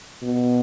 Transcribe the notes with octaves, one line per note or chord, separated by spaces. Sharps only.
B2